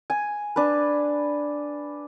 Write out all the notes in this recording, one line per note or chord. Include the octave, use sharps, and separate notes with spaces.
G#5
D4 B4